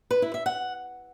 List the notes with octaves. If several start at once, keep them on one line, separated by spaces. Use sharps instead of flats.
B4
E4
E5
F#5